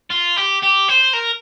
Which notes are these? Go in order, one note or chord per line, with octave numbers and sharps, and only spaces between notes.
F4
G4
G4
C5
A#4